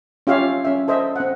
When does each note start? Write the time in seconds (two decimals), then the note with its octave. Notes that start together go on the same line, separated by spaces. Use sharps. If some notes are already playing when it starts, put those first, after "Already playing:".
0.27 C#4 F4 G4 C#5 E5 F5
0.65 C#4 E5
0.88 A4 C5 D#5 E5
1.16 C4 F#5